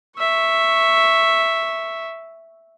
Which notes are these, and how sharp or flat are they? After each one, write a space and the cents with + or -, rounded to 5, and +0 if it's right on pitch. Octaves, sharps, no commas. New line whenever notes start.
E5 +0 C#6 +0